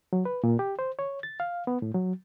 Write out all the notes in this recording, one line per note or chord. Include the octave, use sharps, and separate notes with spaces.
F#3
B4
A#2
G4
C5
C#5
A6
F5
B3
A2
F#3